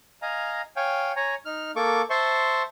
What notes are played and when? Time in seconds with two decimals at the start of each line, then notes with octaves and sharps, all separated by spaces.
0.22 D#5 F5 G#5 A#5
0.76 C#5 F5 G5 G#5
1.16 C#5 G#5 A#5
1.45 D#4 F6
1.76 A#3 A4 C#6 D6
2.10 C5 E5 A5 C6 C#6